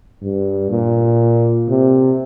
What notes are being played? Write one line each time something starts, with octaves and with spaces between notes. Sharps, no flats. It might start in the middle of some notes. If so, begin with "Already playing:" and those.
G2
A#2
C3